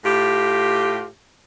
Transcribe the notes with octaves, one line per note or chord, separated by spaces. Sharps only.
A2 F4 G4